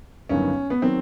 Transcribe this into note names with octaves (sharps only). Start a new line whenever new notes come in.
G1 G2 D#3 F#3 C#4
B3
D#3 F#3 C4